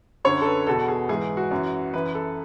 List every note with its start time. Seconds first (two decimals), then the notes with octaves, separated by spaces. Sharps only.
0.25 F#2 D3 C#5
0.41 A4
0.46 B4
0.67 E2 B2 A4
0.88 G#4
1.09 G#2 E3 G#4
1.37 F#4
1.51 F#2 E3
1.93 F#2 E3 B4
2.15 A4